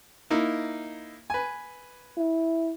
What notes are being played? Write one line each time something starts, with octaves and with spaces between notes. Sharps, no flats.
A#3 D#4 E4
B4 G#5
E4